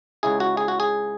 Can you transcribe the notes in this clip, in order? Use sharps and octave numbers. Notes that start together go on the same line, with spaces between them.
C#2 C#3 G#3 C#4 E4 G#4
F#4
G#4
F#4
G#4